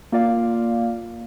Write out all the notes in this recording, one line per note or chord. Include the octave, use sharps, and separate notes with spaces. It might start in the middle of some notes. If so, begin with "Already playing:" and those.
A#3 F4 D5 F5